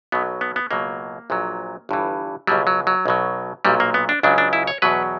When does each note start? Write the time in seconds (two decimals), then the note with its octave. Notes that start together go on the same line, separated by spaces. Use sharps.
0.12 B1 B2 F#3 B3
0.41 B3
0.56 B3
0.71 C#2 B2 F#3 A#3
1.30 A#1 A#2 F#3
1.89 G1 G2 E3
2.47 C#2 B2 F#3 G3
2.67 F#3
2.87 F#3
3.06 B1 B2 F#3
3.65 B1 A#2 F#3 G3
3.80 A#3
3.94 B3
4.09 D4
4.23 C#2 C#3 F#3 D4
4.38 D4
4.53 E4
4.67 C#5
4.82 E2 B2 F#3 B4